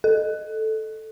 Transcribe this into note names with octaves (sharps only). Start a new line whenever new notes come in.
A4